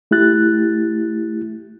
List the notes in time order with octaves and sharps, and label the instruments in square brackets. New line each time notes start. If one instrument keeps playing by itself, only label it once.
[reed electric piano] A3 E4 G4 F#6 A6